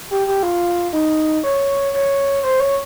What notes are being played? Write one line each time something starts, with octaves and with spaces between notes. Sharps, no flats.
G4
G4
F4
D#4
C#5
C#5
C5
C#5